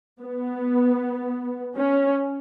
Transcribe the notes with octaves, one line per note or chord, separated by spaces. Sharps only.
B3
C#4